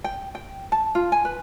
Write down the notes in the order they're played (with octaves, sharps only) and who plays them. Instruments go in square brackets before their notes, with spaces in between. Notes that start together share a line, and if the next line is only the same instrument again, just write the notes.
[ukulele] G5
G5
A5
F4
G#5
B4